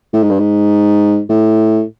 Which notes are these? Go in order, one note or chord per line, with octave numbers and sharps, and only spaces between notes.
A2
G#2
G2
G#2
A2